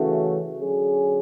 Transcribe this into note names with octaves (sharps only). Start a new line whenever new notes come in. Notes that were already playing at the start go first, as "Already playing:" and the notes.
Already playing: C#3 E3 A3 C#4 F#4
D3 F#3 C#4 G#4